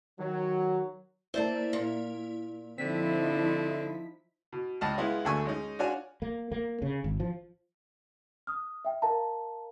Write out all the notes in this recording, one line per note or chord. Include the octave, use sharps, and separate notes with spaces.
D#3 F#3
A#3 E4 C5 D5 A5
A#2
D3 F3 C4 D#4 E4 B6
B2
C#2 D#5 A5 F6
G#3 B3 E4 F4 C#5
D2 D3 A3 G#5 C#6 E6
G#3 C#4 D#4
D4 F4 F#4 C#5 G#5
A#3
A#3
C#3
G#1
F3
D#6 F6
E5 G5
A#4 D#5 F5 A5 A#5